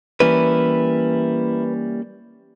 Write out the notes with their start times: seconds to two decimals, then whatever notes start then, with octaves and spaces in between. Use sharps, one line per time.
0.20 E3 G3 A#3 C#4 E4 B4